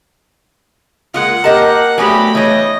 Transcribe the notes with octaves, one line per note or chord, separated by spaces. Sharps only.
G#3 A#3 F4 F#5
A#3 G4 A#4 D#5 A5
F#3 A3 B3 D4 G4 G#5 B5
E3 G3 C#5 D#5